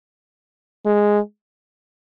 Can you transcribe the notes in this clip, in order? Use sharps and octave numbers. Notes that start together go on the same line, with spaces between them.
G#3